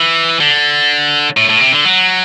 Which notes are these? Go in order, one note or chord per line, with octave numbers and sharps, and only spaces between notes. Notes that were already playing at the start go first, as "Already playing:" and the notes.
Already playing: E3
D3
A2
A2
C3
D3
F#3